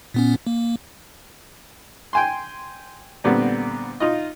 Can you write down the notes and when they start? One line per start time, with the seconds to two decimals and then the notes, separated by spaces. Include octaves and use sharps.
0.14 A#2 B3 C#4
0.47 A#3
2.13 G5 G#5 C6
3.24 A#2 D3 G3 B3 C4
4.00 D#4 F4 D#5